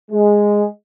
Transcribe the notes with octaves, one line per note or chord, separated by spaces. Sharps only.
G#3